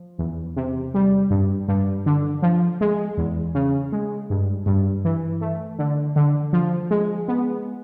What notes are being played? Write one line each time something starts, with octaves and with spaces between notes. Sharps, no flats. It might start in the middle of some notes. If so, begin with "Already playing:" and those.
Already playing: F3
E2
C3
G3
G2
G2
D3
F3
G#3
E2
C#3
G#3
G2
G2
E3
A3
D3
D3
F3
G#3
B3